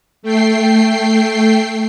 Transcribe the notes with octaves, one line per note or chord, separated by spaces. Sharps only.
A3 G5 C7